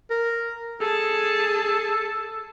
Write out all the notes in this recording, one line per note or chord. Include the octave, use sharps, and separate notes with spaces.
A#4
G#4 A4 A5